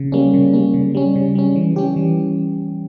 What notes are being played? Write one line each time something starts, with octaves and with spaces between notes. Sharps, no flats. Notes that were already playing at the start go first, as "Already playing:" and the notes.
Already playing: C#3
G3 A#3 C#4
C#3
G3 A#3 C#4
C#3
G3 C#4
C#3
G3 C#4
E3
G3 C#4 G4
E3